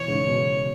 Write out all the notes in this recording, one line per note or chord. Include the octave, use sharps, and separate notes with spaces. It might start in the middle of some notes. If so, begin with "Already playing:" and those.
Already playing: B2 E3 C#5
G#2 C#3
B2